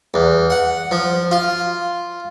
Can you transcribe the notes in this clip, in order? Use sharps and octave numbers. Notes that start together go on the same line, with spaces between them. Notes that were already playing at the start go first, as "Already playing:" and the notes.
E2
F#5
F3
F4